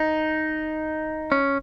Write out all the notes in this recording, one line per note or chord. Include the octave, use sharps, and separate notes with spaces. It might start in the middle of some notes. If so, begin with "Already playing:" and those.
Already playing: D#4
C#4